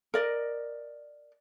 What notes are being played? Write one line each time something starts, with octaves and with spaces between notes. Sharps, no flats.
A#4 D5 D#5